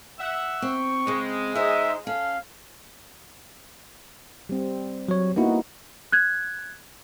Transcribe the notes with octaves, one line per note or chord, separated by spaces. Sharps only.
E5 F#5
C4 C#6
C#3 G#3 C4
D#4 C5 E5
C#4 A4 F5
G3 C4
F#3 C#5
A#3 B3 D#4 E4 F#4
F#6 G#6